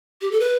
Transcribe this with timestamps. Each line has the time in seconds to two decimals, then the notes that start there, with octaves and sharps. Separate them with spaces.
0.21 G4
0.31 A4
0.40 B4